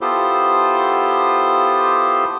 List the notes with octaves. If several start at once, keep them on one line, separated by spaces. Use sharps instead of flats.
B3 E4 F4 G4 A4 C5